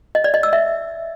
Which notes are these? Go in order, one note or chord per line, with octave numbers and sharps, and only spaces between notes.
D#5
D5
D#5
E6
E5